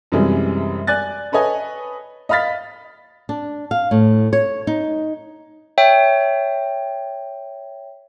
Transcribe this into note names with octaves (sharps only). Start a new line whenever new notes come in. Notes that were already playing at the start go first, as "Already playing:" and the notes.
F#2 C3 E3 G3 G#3 G#4
D5 G#5 F#6 A6
A4 B4 C#5 D#5 G#5
D#5 F5 B5 F6 A6 B6
D4
F5
A2
C#5
D#4
C#5 E5 G5